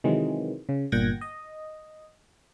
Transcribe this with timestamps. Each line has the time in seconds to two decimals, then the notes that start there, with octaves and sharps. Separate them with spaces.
0.04 C3 D#3 E3 F#3 G#3
0.69 C#3
0.92 G1 A#2 F#5 G5 G#6 A#6
1.21 D#5